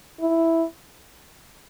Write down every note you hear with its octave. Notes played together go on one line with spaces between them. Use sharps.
E4